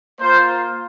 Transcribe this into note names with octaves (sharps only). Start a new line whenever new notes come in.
A#3 F4 C5